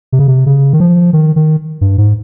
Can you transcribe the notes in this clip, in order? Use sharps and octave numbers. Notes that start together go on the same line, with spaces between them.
C3
C#3
C3
C#3
D#3
F3
D#3
D#3
G2
G#2